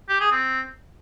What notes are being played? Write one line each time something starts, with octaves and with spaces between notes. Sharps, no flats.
G4
G#4
C4